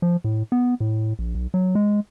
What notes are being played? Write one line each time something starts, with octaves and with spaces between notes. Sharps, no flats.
F3
A2
B3
A2
A#1
B1
F#3
G#3